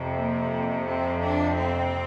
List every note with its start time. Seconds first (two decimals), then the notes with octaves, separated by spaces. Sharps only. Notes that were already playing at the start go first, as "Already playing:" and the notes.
Already playing: F2 C3
0.15 A#3
0.85 C4
1.20 D4
1.56 C4